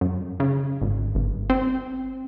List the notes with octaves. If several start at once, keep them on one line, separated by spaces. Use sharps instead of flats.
F#2
C#3
G#1
G1
C4